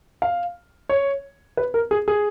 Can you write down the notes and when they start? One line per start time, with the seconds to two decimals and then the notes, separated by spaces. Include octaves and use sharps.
0.22 F5
0.89 C#5
1.57 B4
1.74 A#4
1.91 G#4
2.08 G#4